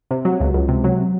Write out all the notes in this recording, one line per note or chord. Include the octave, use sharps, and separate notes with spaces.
C3
F#3
C#2
C#2
C3
F#3